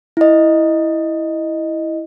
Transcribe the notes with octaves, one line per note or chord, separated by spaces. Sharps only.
E4 D#5